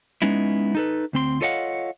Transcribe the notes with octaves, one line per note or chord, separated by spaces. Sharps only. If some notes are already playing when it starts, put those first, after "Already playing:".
G#3 B3 C#4 D#4 E4
D#4 A4 B4
D2 C4 C6
F4 A4 C#5 D#5 F5 F#5